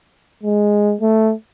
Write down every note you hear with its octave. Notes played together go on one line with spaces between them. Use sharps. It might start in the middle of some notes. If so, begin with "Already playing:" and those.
G#3
A3